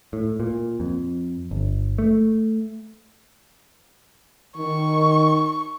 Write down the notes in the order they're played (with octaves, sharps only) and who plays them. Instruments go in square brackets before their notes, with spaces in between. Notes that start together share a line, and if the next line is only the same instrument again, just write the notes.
[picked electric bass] A2
A#2
F2
G1
A3
[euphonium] D#3 [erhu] C#6